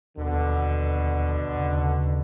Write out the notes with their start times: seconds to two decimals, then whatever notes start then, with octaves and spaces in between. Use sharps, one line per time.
0.17 D#2 B2 D3
1.57 D#2 C#3